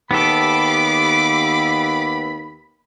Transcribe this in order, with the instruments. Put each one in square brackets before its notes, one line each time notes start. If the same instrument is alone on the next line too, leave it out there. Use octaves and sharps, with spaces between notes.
[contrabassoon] D#2 [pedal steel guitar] B3 G4 A4 [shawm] B5 [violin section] D6 C7